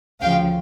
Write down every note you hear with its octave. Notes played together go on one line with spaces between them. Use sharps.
D2 C#3 F3 F5 G5